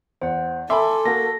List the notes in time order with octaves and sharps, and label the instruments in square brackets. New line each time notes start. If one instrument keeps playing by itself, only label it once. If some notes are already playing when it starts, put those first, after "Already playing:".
[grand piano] E2 [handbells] C5 F#5
[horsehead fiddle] A4 [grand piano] E5 B5 [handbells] G#5 C6 D6
[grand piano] A#3 F#4 [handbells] A#6